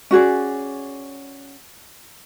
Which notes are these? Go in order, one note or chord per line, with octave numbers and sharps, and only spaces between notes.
C#4 F#4 G#4 D5